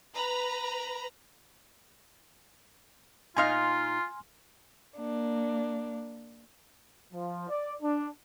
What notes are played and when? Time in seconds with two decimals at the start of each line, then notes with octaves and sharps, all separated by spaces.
0.14 B4 A#5 B5
3.37 A#2 D#4 F4 F5 G#5 C6 F6
4.97 A#3 D4
7.12 F3
7.49 D5
7.81 D4